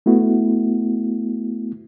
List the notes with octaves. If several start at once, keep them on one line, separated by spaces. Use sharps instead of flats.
A3 B3 E4 F#4